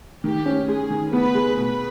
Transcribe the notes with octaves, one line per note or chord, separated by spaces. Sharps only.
D#3 G4
C#4
G#3 G#4
D#3
B3 B4
G#3
B2 B4